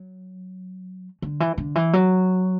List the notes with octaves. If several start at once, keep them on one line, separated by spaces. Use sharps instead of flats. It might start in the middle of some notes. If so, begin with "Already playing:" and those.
Already playing: F#3
D3
E3
D3
E3
F#3